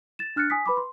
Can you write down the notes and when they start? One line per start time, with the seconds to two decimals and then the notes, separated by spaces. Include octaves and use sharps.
0.19 A6 E7
0.36 D4 F6 F#6 A6 C#7
0.50 G#5 D#6 B6
0.66 B4 B5 D6
0.77 C6